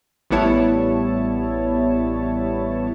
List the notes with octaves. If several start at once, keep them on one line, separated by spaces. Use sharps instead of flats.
A1 G3 B3 E4 C#5 A5